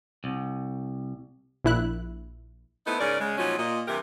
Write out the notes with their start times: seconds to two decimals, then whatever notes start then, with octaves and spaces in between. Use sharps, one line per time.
0.24 C2
1.65 A#1 E4 F#6
2.87 A3 B3 C4 D#4 E4
2.99 G#2 C#3 C#4 A#4 D5
3.20 C#3 G#3
3.38 A#2 F3 F#3 C#4 D#4 F#4
3.59 A#2 D#5
3.88 G2 C3 E3 G4 A#4